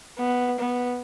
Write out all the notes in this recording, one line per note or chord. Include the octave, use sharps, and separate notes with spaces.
B3
B3